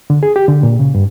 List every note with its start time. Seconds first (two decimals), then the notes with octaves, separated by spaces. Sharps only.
0.10 D3
0.23 G#4
0.36 G4
0.48 D3
0.63 A#2
0.79 C#3
0.95 G2